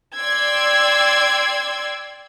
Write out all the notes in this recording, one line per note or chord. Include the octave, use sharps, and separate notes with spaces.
D5 G5 C6 E6 G#6